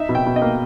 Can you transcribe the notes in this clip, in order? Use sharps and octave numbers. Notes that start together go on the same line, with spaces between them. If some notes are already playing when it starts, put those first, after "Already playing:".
Already playing: D#4 E5
B2
G5
B2
D#5
A#3